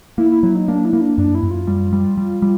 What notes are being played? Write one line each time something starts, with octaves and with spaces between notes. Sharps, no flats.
A#3 E4
E4
F#3 E4
D#4
A#3 D4
E4
A#3
D4
F#2 D4
E4
F#2
F4
G3
G3
G3
G3